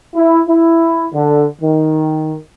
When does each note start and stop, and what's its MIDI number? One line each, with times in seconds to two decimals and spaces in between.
0.15 0.40 64
0.48 1.06 64
1.14 1.46 50
1.62 2.36 51